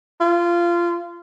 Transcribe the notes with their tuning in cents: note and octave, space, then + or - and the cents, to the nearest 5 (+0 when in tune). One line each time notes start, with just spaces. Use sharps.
F4 -20